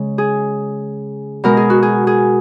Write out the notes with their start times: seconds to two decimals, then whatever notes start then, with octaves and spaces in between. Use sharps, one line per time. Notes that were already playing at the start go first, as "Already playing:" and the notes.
Already playing: C#3 G#3
0.18 G#4
1.44 B2 G#3 A#4
1.57 G#4
1.70 F#4
1.83 G#4
2.07 G#4